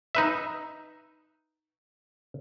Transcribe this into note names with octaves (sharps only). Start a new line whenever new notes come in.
D#4 B4 E5